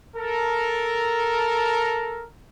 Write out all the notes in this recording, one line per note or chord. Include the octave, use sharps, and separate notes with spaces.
A4 A#4